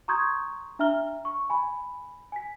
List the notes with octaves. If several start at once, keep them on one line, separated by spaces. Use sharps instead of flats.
A#5 C6 C#6 D#6 G6 G#6
D4 E5 A#5 F6 G7
C#6
G#5 B5
G#5 B6